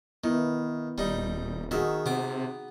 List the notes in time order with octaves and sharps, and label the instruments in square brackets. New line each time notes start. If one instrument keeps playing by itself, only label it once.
[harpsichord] D#3 [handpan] B3 E4
[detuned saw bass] D#1 [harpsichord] G3 D#4
[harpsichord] D#3 E5 [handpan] D#4 F#4 G#4
[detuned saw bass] C3 [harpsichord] B3 D6